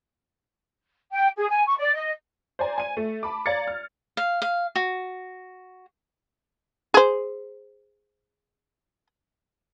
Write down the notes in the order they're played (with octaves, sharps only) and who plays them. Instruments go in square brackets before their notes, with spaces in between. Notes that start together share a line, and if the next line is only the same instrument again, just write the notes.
[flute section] G5
G#4
G#5
C#6
D5
D#5
[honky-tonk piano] C5 D5 G#5 A#5
G#5 D#7
A3
A5 B5 D6
D5 F5 A#5 G#6 A6 C#7
F6
[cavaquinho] F5
F5
F#4
[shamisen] G#4 C5